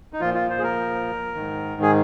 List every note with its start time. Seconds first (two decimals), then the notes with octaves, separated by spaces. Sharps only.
0.13 D#4
0.20 A#2 F3 F4
0.34 F4
0.50 C5
0.58 G#4
0.63 A#4
1.34 G#2 D#3
1.82 G#4